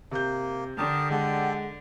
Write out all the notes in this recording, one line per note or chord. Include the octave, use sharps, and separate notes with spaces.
C3 A#3 G6
D3 G4 A#4 A5 D#6
G#3 G4 A4 F#5